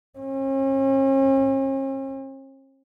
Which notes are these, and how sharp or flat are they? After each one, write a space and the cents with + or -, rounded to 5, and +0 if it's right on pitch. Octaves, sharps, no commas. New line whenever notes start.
C#4 -45